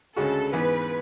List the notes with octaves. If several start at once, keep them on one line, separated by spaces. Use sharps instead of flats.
D2 C#3 G#3 C#4 F#4 A4
G#2 E3 B3 B4